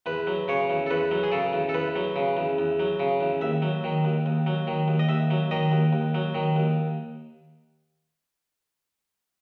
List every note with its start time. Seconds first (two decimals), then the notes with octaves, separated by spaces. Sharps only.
0.06 E2 B4
0.27 F#3
0.48 C#3 C#5
0.70 E2
0.86 A4
0.90 E2 B4
1.11 F#3
1.23 G#4
1.32 C#3 A4
1.53 E2
1.69 A4
1.74 E2 B4
1.96 F#3
2.16 C#3
2.37 E2
2.58 E2
2.79 F#3
3.00 C#3
3.21 E2
3.41 D#2 E5
3.62 F#3
3.84 D#3
4.05 D#2
4.26 D#2
4.46 F#3
4.67 D#3
4.88 D#2
4.99 D#5
5.09 D#2 E5
5.30 F#3
5.51 D#3 D#5
5.72 D#2
5.93 D#2
6.14 F#3
6.34 D#3
6.56 D#2